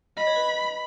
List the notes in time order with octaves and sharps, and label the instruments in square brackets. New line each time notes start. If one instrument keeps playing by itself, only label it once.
[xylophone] D#5 [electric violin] B5
[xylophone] C#5
B4